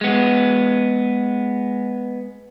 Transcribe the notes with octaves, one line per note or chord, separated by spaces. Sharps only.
G#3 B3